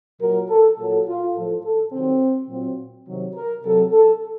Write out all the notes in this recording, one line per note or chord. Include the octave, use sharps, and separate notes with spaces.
A#2 F#3 A#4
A4
A#2 F#3 A4
F4
A2 F3 A4
A4
C3 D#3 F#3 C4
A#2 F#3 C4
C3 D#3 F#3
A#4
C3 F#3 A4
A4